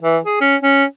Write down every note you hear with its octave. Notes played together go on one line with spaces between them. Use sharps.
E3
G#4
C#4
C#4